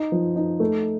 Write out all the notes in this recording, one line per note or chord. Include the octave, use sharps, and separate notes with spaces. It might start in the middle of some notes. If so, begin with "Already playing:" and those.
Already playing: D#4
F3
D#4
A3